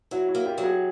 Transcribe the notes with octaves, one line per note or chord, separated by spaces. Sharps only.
F#3 E4 F#4
E4 F#4
A#3
F4 G4
F#3
F#4 G#4